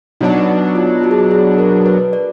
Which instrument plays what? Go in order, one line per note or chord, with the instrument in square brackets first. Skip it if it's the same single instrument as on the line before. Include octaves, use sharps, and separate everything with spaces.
[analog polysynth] B2 F#3 D4 [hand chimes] D#4
[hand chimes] F4
F#4
G#4
F#4
G#4
A#4
B4
D5